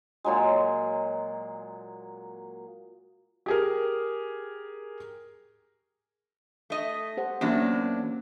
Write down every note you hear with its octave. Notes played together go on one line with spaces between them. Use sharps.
A#2 F#3 G#3
G4 G#4 A#4
A3 D#5
G4 C5 F#5
E2 F#3 A#3 C#4 D4 G4